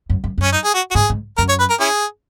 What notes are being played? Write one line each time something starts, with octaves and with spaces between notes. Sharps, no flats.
F#2
F#2
F#2 C#4
D#4
G#4
F#4
F#4
G#2 G#4
G#2
F#2 A#4
C#5
B4
A#4
C#4 E4 G#4